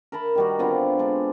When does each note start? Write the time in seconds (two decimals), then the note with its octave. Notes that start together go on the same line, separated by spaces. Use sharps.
0.12 A#4 E5 A5 B5
0.35 D#3 G3 F#4
0.59 D3 B3 C4 F4
0.99 G#3 D4